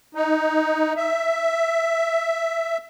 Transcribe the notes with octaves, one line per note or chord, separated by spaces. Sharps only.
D#4
E5